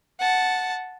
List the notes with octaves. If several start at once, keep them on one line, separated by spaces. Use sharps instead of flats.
F#5 A5